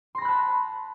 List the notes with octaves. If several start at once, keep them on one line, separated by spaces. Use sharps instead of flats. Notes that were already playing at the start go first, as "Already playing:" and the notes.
A5 B5 C6 F#6 A#6